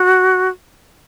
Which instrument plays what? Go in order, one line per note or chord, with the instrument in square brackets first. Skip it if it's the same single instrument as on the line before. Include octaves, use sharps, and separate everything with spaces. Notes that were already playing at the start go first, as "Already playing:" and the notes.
Already playing: [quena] F#4